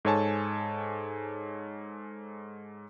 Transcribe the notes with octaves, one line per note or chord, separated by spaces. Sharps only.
G#2 A4 C#5 G#5 A5